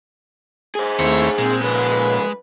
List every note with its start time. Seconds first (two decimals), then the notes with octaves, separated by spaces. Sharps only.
0.75 G#4 C5
0.99 D#2 A3 C4 E4 C#5
1.38 A#2 G#3 C4
1.62 C#3 F3 B4